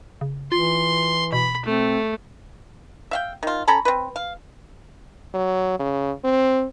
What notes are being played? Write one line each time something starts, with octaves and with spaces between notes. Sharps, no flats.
C#3
E3 F4 C6
B2 B5
A3 C4
E5 F5 G5
D#3 F4
C#4 A4 A#5 B5
C4 B4
F5
F#3
C#3
C4